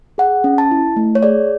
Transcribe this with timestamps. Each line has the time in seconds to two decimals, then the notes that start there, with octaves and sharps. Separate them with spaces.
0.18 G#4 F#5
0.44 C#4
0.58 A5
0.71 E4
0.96 A3
1.15 C#5
1.23 G#4 D5